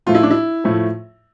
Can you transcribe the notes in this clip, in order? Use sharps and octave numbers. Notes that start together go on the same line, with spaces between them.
A2 F3 A3 F4
E4
D4
E4
A2 F3 A3